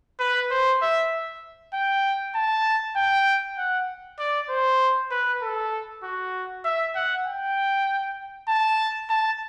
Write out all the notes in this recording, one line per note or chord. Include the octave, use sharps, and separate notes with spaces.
B4
C5
E5
G5
A5
G5
F#5
D5
C5
B4
A4
F#4
E5
F#5
G5
A5
A5